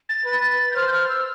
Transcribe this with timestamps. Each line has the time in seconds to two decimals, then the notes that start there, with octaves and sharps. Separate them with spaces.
0.09 A6
0.25 B4
0.71 G6
0.76 C5 F6
0.87 G6
0.93 F6
1.09 E6